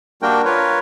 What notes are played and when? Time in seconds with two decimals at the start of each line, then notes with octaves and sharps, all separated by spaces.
0.22 G3 A#3 D4 F#4 A#4 G5
0.45 F4 A#4 B4 C#5